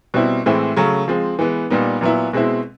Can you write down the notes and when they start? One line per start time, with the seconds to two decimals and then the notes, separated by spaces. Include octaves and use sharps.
0.14 B2 G3 C4 E4
0.46 A2 E3 G#3 C4 E4
0.77 C#3 F#3 A3 C#4
1.08 F3 G#3 C4
1.39 E3 G#3 B3
1.70 A#2 G3 B3 D#4
2.01 A#2 F#3 B3 E4
2.33 B2 G#3 C4 E4